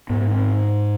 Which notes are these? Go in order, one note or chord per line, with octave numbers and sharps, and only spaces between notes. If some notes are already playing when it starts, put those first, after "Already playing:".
G#2 B3
C4